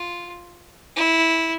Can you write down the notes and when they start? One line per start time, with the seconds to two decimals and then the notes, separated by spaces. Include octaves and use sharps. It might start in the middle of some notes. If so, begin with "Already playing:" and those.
Already playing: F4
0.96 E4